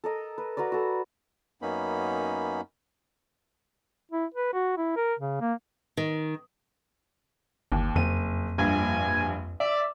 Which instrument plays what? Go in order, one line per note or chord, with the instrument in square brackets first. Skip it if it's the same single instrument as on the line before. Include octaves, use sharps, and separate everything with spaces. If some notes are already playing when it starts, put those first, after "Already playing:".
[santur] A4 A#4 D#5
B4
F#4 A#4 B4 D5
F#4 A4
[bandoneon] F#2 A#3 B3 C#4 D#4 B5
[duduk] E4
B4
F#4
E4
A#4
C#3
A#3
[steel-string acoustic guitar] D#3
[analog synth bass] G1 [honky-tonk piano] D#2
[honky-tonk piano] F#1 D#7 [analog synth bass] F2
[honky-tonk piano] A#1 G2 [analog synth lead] G#5
[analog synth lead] D5 [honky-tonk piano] E5